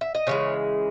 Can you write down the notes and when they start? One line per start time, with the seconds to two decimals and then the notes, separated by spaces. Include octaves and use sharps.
0.01 E5
0.15 D#5
0.27 C#3 E3 G#3 C#5